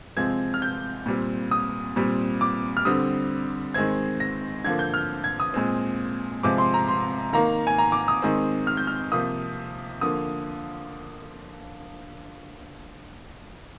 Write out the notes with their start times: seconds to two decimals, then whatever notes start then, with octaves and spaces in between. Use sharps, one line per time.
0.17 C3 F3 G#3 C4 G#6
0.54 F6
0.62 G6
1.06 A#2 G3 C4
1.51 D#6
1.96 A#2 G3 C4
2.41 D6
2.77 F6
2.85 D3 G3 C4 D#6
3.74 D#3 G#3 C4 G#6
4.20 A#6
4.64 D3 F3 A#3 G#6
4.79 G6
4.94 F6
5.24 G#6
5.40 D#6
5.54 A#2 G#3 C4
6.43 C3 F3 G#3 C4 D6
6.58 C6
6.74 A#5
6.89 C6
7.33 D#3 A#3 A#5
7.67 G#5
7.78 A#5
7.92 D6
8.08 D#6
8.22 D#3 G#3 C4
8.67 F6
8.77 G6
8.87 F6
9.12 C3 F3 A#3 D#6
10.01 D3 F3 A#3 D#6